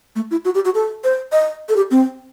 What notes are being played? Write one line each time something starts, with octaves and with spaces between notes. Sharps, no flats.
A3
E4
F#4
G4
F#4
A4
C5
D#5
A4
G4
C4